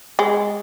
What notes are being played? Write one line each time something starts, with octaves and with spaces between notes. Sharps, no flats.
G#3